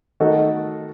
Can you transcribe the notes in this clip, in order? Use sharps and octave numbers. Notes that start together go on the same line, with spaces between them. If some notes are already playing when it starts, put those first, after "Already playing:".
D#3 A3 D#4 F#4 A4